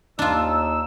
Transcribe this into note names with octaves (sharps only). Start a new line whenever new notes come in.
D#2 D4 D#4 F4 E6